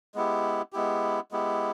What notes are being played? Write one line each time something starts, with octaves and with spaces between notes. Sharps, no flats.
G#3 B3 E4 G4
G#3 B3 E4 G4
G#3 B3 E4 G4